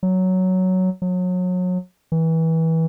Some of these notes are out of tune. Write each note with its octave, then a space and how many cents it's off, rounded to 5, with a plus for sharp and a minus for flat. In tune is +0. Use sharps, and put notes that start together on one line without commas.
F#3 +5
F#3 -30
E3 -25